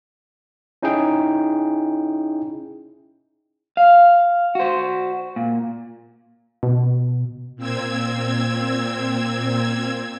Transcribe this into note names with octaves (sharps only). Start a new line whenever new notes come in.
C#4 D#4 E4 G#4 G5
F5
F#4 C5
A#2
B2
A#2 C4 E6 G#6